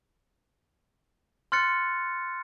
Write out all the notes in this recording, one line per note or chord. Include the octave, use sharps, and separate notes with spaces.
C6 F6 F#6 A6 C#7